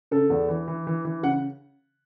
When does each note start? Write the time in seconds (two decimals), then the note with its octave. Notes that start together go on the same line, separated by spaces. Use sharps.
0.11 C#3 A4
0.30 E2
0.49 E3
0.68 E3
0.87 E3
1.05 E3
1.23 C#3 F#5